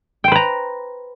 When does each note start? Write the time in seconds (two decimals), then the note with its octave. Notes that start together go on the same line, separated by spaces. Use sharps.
0.24 G5
0.28 C5
0.32 B4
0.35 A#5